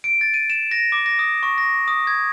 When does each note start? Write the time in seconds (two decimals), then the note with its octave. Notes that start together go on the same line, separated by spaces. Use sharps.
0.04 D7
0.21 A6
0.34 D#7
0.50 E7
0.71 A#6
0.92 D6
1.06 A#6
1.19 D#6
1.43 C#6
1.58 A#6
1.88 D#6
2.07 G#6